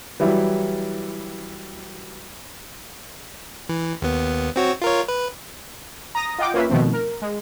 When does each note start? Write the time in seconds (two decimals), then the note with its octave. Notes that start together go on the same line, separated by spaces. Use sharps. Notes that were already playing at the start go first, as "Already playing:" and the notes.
0.20 E3 F#3 G3 E4
3.69 E3
4.02 D#2 B3
4.56 C4 F#4 C#5
4.82 F4 A#4 C#5
5.08 B4
6.15 A#5 D#6 A#6
6.38 F4 D#5 F#5 G5 D6
6.54 A#3 C#4 F4 B4 E5
6.70 B2 D#3 F3 A3 C4
6.93 A#4
7.22 G#3